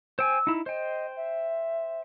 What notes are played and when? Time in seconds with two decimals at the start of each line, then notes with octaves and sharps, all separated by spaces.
0.19 C5 G5 G#5 E6
0.47 D#4 E4
0.66 C5 D#5 G5
1.17 E5